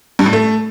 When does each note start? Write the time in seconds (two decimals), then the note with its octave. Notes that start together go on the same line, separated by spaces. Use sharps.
0.19 G2
0.26 A2
0.33 A3